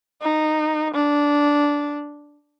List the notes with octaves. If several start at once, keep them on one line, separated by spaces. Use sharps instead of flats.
D#4
D4